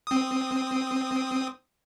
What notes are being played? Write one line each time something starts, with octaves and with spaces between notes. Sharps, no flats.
C4 D#6